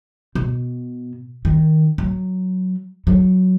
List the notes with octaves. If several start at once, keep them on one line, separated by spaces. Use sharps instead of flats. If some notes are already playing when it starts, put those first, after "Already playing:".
B2
D#3
F#3
F#3